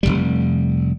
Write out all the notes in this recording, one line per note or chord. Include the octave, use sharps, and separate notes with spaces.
F1 B1 G3